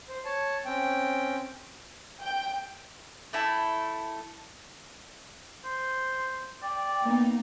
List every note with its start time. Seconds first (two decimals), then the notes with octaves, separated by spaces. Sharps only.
0.09 C5
0.25 C#5 A5
0.65 C4 C#4 G5
2.22 G5
3.33 A3 E4 A4
5.65 C5
6.63 D5 G5
7.02 A#3 B3 D#4